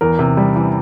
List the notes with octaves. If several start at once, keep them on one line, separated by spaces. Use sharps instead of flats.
E2 A#4
C3
G3
E3